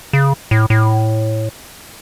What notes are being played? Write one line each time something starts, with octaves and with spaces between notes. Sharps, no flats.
C#3
A2
A2